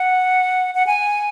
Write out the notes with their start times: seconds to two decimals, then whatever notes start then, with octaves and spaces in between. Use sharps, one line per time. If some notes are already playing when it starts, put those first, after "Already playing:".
Already playing: F#5
0.75 F#5
0.87 G#5